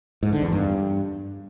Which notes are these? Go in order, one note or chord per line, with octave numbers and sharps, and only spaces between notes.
G#2
D3
E2
G2